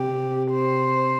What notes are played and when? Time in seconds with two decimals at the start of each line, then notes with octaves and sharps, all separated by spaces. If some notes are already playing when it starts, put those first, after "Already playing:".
Already playing: C3 G4
0.52 C5